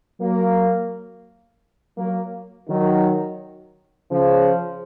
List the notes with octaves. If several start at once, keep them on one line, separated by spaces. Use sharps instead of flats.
F#3 A#3
F#3 A#3
D#3 F#3
C#3 F3